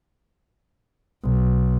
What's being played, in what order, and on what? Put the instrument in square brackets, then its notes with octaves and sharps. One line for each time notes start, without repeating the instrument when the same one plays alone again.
[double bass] B1